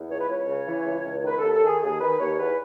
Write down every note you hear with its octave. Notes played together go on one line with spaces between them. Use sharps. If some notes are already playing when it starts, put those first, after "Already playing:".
Already playing: E2
C#2 C#5
B4
C#2 C#5
C#3
E3
C#2
C#2
D#3 B4
D#2 A4
A4
D#3 G#4
D#2 G#4
D#3 B4
D#2 C#5
E2 B4